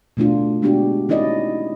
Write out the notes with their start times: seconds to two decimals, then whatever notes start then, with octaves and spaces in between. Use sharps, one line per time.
0.17 B2 A3 D4 F4
0.62 G#3 B3 D4 F#4 G4
1.09 C#4 D#4 E4 D5 D#5